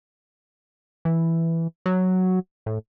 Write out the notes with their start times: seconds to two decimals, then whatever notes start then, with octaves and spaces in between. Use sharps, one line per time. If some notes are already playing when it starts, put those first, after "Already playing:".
1.05 E3
1.86 F#3
2.66 A2